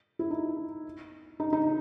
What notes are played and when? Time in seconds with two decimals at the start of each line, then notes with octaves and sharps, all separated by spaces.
0.19 E4
0.31 D#4
1.40 D#4
1.53 D#4